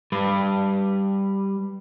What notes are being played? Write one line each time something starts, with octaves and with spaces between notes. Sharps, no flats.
G3 B4